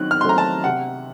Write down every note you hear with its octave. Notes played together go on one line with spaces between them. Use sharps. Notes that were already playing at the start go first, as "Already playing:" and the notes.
Already playing: D#3 F#3 C4 F#6
F6
C6
F#3 A3 C4 A#5
A5
C3 F#5